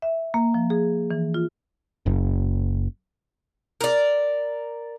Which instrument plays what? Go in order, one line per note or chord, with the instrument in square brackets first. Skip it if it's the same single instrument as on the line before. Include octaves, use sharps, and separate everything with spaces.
[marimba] E5
A#3
F3
G#4
E3
F4
[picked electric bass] F#1
[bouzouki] A#4 D5